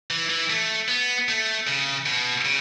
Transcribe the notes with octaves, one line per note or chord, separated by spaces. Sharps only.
E3
E3
A3
B3
A3
C#3
B2
C#3